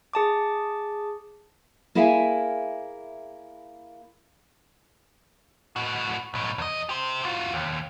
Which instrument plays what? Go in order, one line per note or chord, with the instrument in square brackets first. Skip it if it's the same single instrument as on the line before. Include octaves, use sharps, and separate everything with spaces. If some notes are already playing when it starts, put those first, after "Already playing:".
[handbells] G#4 A5 D6
[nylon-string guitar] A#3 E4 G#4 E5 F5 G#5
[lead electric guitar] A2 F#4
B1 A2
E2 D#5
G4 C5
F4 F#4
D#2